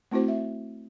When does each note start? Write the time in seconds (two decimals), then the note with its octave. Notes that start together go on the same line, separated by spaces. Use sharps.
0.11 A3 C4 E4 F#4 C5
0.28 E5